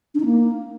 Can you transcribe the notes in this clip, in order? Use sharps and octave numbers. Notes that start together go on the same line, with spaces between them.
D4
D#4
A#3